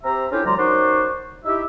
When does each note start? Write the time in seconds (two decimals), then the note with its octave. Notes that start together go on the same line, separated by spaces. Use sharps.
0.03 C4 G4 C5 E5 A#5
0.31 C#4 D4 E4 F4 G4 A4
0.45 D2 F3 G3 D5 A#5 C6
0.57 F#2 D#4 C5 D5 F#5 C#6
1.45 D#4 E4 G4 E5